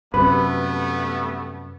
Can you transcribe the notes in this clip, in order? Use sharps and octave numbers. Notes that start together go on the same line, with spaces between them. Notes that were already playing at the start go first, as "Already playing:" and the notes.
F#2 C3 G3 A3 B3 B4